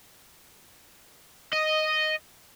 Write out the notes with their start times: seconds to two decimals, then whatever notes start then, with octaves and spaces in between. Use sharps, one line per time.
1.53 D#5